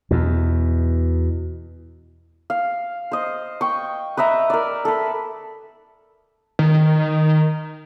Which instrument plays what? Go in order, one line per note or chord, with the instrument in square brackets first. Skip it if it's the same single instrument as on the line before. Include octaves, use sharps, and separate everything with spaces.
[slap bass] E2 B2
[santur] F5
C5 D#5
G5 C#6
B4 D#5 E5 A#5
A#4 D5
A4 B4
[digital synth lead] D#3